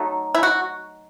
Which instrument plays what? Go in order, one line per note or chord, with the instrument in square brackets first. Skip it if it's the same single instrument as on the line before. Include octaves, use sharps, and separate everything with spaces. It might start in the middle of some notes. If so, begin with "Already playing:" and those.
Already playing: [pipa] F#3 A3 D#4
E4
F#4